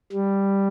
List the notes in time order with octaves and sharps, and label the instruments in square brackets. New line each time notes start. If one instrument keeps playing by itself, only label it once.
[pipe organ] G3